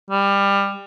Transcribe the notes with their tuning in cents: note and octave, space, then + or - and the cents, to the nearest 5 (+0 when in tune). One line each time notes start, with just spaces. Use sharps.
G3 +20